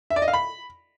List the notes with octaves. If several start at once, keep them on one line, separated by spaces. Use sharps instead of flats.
E5
D5
D#5
F5
B5